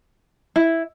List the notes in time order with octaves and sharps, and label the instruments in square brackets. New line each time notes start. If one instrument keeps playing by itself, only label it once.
[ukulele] E4